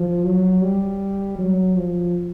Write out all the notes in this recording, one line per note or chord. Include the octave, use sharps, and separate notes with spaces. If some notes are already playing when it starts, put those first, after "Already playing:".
Already playing: F3
F#3
G3
F#3
F3